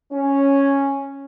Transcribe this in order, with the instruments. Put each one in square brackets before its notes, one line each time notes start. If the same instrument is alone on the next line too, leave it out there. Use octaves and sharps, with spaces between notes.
[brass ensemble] C#4